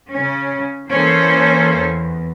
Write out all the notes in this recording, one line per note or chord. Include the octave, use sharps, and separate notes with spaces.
C#3 C#4
E3 A#3 C#4 A4 C5
E2